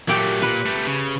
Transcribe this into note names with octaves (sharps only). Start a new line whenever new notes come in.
A#2 F#3 A3 G4 G5
A#2 B4
A3 G4
C#3